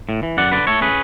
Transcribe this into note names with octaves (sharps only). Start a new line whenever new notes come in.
A2
E3
F#2 D5 F#5
D3 B4 D5
A3 A4 C#5
C#4 G#4 B4